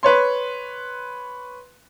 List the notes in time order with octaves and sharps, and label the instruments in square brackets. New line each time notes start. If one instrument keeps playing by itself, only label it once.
[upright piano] B4 C#5 C6